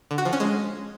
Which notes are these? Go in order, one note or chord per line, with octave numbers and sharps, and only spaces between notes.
D3
F#4
F3
C#4
G#3